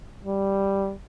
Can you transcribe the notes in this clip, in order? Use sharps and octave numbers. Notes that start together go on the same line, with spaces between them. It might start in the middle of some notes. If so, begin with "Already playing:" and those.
G3